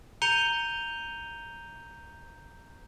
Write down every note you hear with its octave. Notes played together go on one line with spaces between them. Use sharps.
A#5 G6 C#7 D#7 F7 G7